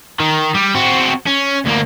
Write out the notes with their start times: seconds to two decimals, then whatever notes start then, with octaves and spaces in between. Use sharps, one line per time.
0.20 D#3
0.54 G3
0.75 C4 F#4
1.27 C#4
1.66 D2 A#3